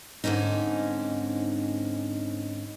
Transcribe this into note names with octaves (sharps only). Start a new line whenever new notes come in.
G#2 D3 C4 C#4 D#4